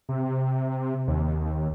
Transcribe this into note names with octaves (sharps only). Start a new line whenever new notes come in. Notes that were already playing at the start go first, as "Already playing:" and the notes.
C3
D#2